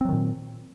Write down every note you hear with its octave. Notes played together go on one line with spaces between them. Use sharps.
A#2 D#3 F#3 C4